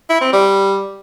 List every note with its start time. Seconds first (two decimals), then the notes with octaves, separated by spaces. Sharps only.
0.09 E4
0.21 C4
0.33 G3